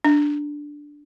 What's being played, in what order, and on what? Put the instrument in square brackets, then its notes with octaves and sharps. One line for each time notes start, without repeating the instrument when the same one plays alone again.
[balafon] D4